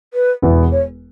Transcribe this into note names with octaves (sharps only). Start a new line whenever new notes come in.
B4
E1 E2 E3 B3 E4
C#5